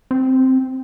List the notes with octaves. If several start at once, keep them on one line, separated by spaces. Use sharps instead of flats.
C4